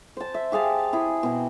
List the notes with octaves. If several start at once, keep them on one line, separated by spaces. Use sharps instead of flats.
C5 A5
E5
G4 G#4 F5 A5
E4 G#4
B2 G5